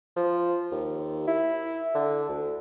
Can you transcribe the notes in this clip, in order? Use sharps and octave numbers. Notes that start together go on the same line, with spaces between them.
F3
D#2
E4
D3
D2